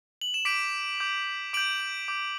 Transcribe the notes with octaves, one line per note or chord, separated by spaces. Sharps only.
F#7
E7
D6 G6 B6 D7
D6 G6
D6 G6 D7 F#7
D6 G6